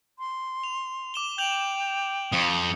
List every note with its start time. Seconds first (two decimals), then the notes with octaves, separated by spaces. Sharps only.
0.19 C6
0.64 F7
1.14 D6 E7 G7
1.38 G5 G6 F7 F#7
2.32 F2 D#6 C#7